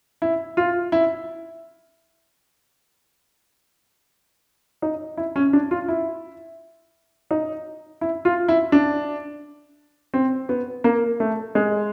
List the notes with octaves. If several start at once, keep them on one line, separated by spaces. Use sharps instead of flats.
E4
F4
E4
D#4
E4
C#4
D4
F4
E4
D#4
E4
F4
E4
D4
C4
B3
A#3
A3
G#3